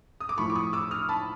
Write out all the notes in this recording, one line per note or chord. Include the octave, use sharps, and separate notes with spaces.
D#6
D6
A2 F3 A3 B5 C#6
D6
C#6 D#6
D6 E6
D#6 F6
A5 B5